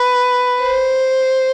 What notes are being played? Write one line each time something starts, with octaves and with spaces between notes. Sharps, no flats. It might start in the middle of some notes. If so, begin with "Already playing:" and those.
Already playing: B4
C5